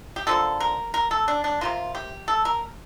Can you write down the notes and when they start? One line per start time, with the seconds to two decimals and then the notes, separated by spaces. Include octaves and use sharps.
0.16 G4
0.27 D3 F3 A#3 A4
0.60 A#4
0.94 A#4
1.11 A4
1.28 D4
1.44 D4
1.61 C3 D#3 A#3 F4
1.95 G4
2.28 A4
2.45 A#4